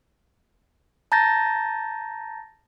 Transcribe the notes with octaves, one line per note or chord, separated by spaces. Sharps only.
A5 A#5 G6 A6 A#6